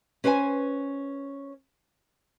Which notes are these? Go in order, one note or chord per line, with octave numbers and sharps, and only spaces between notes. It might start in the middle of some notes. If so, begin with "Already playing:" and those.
C#4 B4 C5 G5 G#5